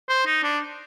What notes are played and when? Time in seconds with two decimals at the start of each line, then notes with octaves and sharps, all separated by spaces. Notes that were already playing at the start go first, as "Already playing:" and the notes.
0.09 C5
0.26 D#4
0.43 D4